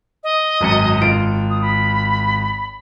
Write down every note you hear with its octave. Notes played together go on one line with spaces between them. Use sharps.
D#5
G#1 F#2 C#7
G#1 F4 D7
D#6
B5